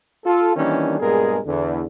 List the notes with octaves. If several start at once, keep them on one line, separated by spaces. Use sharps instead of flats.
F4 A4
D#3 E3 G3 A#3 C#4 D4
G2 A#2 G#3 B3 G#4 A#4
E2 D3